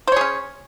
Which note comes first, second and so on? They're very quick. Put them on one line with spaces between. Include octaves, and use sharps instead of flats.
C5 C#5 G#4 C#4